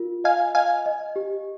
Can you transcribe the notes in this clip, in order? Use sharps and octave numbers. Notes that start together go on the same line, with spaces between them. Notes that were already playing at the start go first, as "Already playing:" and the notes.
Already playing: F4 A#4
D#5 F5 G#5
D#5 F5 G#5
D#5
G4